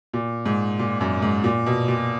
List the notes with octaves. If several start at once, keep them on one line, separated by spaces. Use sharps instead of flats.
A#2
G#2
A#2
F#2
G#2
A#2
B2
A#2